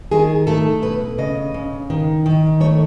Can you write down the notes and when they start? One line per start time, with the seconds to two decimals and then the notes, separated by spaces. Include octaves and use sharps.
0.11 D#3 G#4
0.47 A3 A4
0.82 B2 B4
1.18 C#3 D#5
1.54 C#3
1.90 D#3
2.26 D#3
2.60 A3 C#5